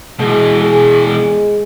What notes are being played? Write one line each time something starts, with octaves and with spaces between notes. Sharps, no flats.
B2 E3 G#3
G#4
G#3